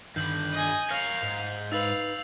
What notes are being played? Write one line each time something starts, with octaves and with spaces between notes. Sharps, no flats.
G2 D3 D#3 G6 F#7
D#5 G#5
A#4 C#5 F5 F6
G#2
D#4 B4 F5 E6 A6 F#7